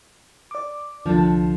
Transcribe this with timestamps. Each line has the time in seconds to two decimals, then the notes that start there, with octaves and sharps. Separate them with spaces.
0.51 D5 D6
1.06 C2 D3 F3 D4 A4